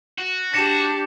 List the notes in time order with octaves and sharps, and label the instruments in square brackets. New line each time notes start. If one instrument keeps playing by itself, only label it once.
[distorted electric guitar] F#4
[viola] D4 G4 [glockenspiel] A#6 C#7 E7